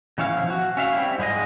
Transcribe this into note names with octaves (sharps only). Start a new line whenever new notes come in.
B2 E3 C#4 E4 F5
F3
F#4
C#4 E5 F5
G3 C4 E4
G#2 G3 G#3 G#4 D#5